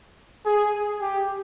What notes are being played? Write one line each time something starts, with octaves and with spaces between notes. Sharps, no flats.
G#4
G4